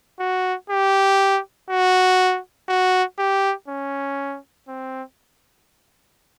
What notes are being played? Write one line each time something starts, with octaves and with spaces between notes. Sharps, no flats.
F#4
G4
F#4
F#4
G4
C#4
C4